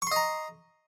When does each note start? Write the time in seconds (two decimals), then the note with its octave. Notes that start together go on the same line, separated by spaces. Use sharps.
0.02 C#6
0.07 C6
0.11 D#5
0.16 A#5